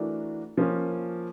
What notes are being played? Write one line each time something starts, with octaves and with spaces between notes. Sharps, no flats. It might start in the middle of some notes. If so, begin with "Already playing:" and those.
Already playing: E3 A3 D4 F#4 A#4
F3 A#3 C#4